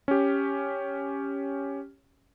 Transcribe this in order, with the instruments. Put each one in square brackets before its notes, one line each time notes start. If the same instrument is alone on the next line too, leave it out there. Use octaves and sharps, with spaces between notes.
[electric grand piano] C#4 G4